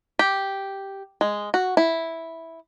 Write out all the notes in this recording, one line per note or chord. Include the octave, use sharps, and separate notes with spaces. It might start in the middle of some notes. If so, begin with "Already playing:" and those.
G4
G#3
F#4
E4